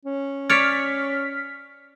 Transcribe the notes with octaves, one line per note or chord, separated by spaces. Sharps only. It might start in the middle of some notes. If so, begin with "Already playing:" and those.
C#4
C#5 D5 F6 B6